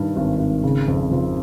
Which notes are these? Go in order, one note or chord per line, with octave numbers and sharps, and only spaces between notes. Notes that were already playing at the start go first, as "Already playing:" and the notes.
Already playing: G2 D#3
G#1
G#1
C#3
F2
F3